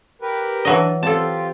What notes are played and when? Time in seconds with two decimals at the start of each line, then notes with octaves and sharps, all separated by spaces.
0.22 G4 A#4 B4
0.65 E3 F#3 D4 D#5
1.03 C4 F4 G4 A4 A5